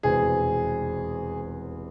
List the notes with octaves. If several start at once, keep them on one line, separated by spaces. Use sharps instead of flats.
F1 E2 B2 G#3 C4 G#4